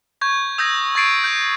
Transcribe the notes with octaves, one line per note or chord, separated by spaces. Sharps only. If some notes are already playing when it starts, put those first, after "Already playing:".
C#6 G6 G#6
D#6 E6 G6 G#6 A#6
C#6 G#6 A6 C7 D7 D#7
G6